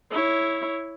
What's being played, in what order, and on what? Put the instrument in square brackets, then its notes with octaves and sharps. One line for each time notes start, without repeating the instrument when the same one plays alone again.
[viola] E4 C#5